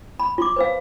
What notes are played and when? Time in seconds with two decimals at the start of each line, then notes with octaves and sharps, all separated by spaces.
0.20 B5
0.38 F4 C6 D6
0.56 B4 C5 F5